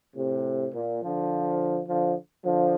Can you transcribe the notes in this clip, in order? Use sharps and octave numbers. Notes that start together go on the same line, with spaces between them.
A2 C3
A#2
D3 F3
D3 F3
D3 F3